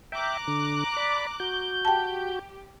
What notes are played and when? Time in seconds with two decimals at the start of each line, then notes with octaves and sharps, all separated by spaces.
0.12 E5 G5 A#5 D6 F#6
0.48 D3
0.96 D5 B5
1.40 F#4 G6
1.85 G4 G5 A5